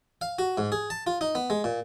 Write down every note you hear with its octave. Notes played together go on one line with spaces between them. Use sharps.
F5
F#4
G#2
G#4
A5
F4
D#4
B3
G#3
A#2